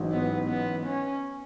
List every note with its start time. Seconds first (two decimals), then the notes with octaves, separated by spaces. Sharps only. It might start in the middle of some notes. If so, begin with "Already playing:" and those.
Already playing: A1 G#2 F#3
0.12 B3
0.49 B3
0.86 C#4